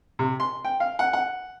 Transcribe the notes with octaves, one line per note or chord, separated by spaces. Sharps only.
C3
C6
G5
F5
F#5
F#5